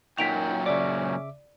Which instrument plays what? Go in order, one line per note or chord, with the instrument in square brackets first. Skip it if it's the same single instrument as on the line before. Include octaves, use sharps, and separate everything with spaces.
[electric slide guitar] F#2 A#2 F#4 [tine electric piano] D#4 [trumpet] G5 [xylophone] B6 D7 F7
[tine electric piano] C#3 E5 D6 [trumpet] C#4 [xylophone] D5